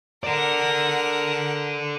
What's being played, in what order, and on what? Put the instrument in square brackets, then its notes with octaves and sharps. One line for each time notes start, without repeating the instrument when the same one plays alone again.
[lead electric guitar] A4 D5 [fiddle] A#4 F#5